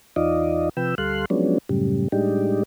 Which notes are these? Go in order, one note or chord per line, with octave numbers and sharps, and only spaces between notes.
E2 D#4 F4 D5 D#5
C3 F3 B4 G5 E6
D2 G3 A4 F5 C6 F#6
F3 F#3 G#3 B3 C#4 D4
F#2 A2 C#3 G3
A2 G3 G#3 D4 D#4 G4